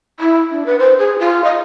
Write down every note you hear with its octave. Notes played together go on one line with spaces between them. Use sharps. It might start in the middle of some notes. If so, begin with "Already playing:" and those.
E4
D4
B4
C5
G#4
F4
D#5